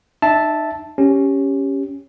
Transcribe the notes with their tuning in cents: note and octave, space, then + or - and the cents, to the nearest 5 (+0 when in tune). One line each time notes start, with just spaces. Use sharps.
D#4 -35 E5 -5 A5 +0
C#4 +0 G4 +0